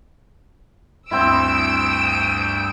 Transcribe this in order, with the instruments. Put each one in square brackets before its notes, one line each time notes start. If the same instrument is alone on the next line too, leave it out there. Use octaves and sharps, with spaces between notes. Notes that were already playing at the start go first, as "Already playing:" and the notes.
[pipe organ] D2 G6 [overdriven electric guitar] G2 [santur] C4 E4 [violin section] E6 D7